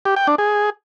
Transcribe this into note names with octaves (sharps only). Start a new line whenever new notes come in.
G4
G5
D4
G#4